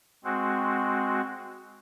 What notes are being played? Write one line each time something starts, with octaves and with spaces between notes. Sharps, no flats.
G#3 C4 F#4